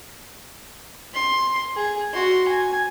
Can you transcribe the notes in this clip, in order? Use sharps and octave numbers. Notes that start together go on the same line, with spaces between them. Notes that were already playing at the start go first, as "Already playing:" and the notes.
C6
G#4
F#4 C6
G#5